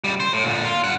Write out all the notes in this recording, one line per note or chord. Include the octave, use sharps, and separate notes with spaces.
C#2 G3
C5
A2
A#2 D3
F4
G2 F#5